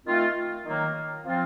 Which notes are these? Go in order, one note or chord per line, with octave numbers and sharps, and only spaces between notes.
D#3 A3 C4 F4
D#3 F#3 A#3
F3 C4 F4